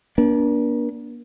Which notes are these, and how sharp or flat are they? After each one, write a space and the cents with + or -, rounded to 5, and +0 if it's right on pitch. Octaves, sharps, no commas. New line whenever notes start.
A#3 +40 D4 -15